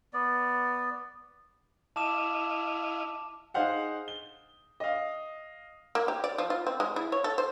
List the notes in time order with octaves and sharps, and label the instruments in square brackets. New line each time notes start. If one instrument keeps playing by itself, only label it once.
[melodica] B3 D5
[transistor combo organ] E4 D#5 F5 [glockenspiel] A5 D6 E7
[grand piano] D#4 G#4 C5 F5 F#5
G7
D#5 F5
[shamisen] A#3
G4
D5
F3
F4
C4
G#3
E4
C#5
A4
C5